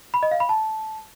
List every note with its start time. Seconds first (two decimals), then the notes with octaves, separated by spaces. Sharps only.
0.14 B5
0.23 D#5
0.31 F5
0.40 B5
0.49 A5